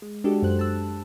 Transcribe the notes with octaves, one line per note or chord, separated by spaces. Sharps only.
G#3
G#3 D4 F#4 G4 A4
F#2 C5 F#6
A5 E6